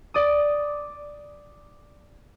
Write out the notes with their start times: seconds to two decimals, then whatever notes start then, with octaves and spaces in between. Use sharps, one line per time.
0.14 D5 D#6